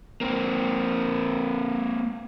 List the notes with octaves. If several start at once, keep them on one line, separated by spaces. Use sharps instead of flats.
A#3 C4